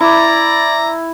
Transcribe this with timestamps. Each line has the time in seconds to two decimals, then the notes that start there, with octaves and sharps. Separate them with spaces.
0.01 E4 D5 A#5